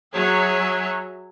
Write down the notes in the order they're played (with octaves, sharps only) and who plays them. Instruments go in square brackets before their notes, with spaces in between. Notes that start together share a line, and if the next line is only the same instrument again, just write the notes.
[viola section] F#3 G#4 C#5 E5